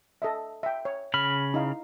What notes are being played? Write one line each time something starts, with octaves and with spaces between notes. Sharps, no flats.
A4 D#5 E5
E5 G5
C#5
C#3 B5 F6
D#4 E4 F5